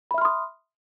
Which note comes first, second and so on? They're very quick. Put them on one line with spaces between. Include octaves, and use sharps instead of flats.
B5 E5 F6 C6 D#6